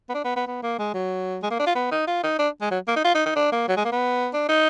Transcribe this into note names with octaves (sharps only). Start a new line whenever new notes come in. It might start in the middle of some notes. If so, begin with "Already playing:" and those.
B3
D4
B3
B3
B3
A#3
G#3
F#3
G#3
A#3
D4
F4
B3
D#4
F4
D#4
D4
G#3
F#3
A#3
D#4
F4
D#4
D#4
D4
A#3
F#3
G#3
A#3
B3
D4
D#4